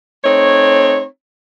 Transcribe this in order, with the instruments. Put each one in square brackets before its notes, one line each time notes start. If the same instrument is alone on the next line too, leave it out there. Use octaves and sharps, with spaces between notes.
[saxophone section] A3 C4 D#4 C#5